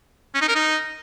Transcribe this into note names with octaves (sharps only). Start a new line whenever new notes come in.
C#4
D#4
A#4
D#4